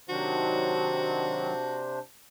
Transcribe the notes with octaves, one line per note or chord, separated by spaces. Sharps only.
C3 D#3 F#3 D4 F#4 C5